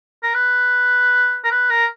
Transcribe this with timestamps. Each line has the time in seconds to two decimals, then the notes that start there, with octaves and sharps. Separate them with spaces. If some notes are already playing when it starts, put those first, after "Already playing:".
0.23 A#4
0.34 B4
1.44 A#4
1.51 B4
1.70 A#4